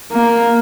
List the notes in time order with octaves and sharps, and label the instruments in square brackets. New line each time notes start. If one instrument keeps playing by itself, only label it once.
[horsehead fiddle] A#3